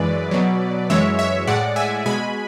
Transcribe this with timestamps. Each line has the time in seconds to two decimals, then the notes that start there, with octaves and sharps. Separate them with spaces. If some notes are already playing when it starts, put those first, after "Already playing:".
Already playing: F#2 E3 G#3 B4 D5
0.31 B2 F#3
0.90 F#2 E3 G#3 C#5 E5
1.19 C#5 E5
1.47 A2 G#3 D5 F#5
1.76 E5 G#5
2.06 B2 G#3 G#5 B5